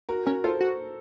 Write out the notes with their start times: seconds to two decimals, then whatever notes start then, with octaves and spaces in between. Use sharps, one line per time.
0.09 F#4 A#4
0.26 C#4 F#4 A#4
0.44 F4 A4 C5
0.60 F#4